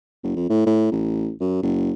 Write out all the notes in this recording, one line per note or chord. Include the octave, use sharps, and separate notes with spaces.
F#1
F2
A2
A2
A1
F#2
F#1